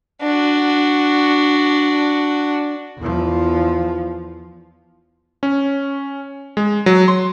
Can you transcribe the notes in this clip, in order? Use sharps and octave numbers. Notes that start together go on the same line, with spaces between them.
D4 F#4
E2 F3
C#4
G#3
F#3
C6